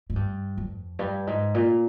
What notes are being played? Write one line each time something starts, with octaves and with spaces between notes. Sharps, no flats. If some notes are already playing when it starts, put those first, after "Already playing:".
G#2
G2
F2
G2
G#2
A#2